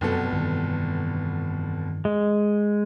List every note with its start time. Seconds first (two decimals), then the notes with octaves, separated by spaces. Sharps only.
0.01 F1 F#2 B2 A4
0.32 G2 D#3 E3
2.05 G#3